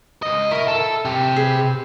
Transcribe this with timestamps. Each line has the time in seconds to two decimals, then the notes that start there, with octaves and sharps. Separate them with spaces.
0.23 C#2 D#5
0.51 E4 A#4 C#6
0.68 A4
1.05 C3 G4
1.36 G#4 B4